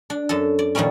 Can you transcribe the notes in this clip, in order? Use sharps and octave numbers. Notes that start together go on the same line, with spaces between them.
D4
F#2 A4
D5
A#2 D#3 F3 G3 C#4